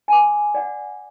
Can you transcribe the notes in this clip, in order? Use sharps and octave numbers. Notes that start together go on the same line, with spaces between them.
G#5 D6
D5 F#5